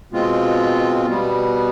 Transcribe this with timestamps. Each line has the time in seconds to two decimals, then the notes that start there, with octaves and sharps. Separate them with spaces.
0.11 B2 G#3 C4 F4
1.06 B2 G3 B3